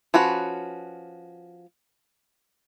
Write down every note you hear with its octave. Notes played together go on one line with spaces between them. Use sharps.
F3 C#4 F#4 B4